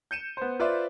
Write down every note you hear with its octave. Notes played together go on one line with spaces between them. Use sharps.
G6 C#7 D#7 E7
B3 C5
F4 B4 C5 D5 E5